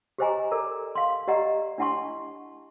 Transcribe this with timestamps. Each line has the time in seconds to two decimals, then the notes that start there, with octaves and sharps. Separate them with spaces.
0.18 G4 G#4 C5 D#5 G#5 A#5
0.51 A4 A#4 D5 A#5
0.95 F5 C6
1.28 G4 D5 D#5 F#5 A#5
1.78 D4 E4 F#5 A5 C6 C#6